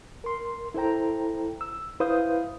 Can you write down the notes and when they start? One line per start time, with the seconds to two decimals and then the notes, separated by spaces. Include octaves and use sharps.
0.24 A#4 C6
0.74 E4 A4 C5 G5 A#5
1.61 E6
2.00 E4 B4 C5 F5 D#6 G6